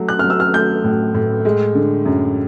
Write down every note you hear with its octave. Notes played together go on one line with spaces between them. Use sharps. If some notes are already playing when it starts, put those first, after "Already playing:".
Already playing: F#3 A3
F#6
F#3 F6
E6
F6
A3 G6
A2
A2
G#3
D3
F#2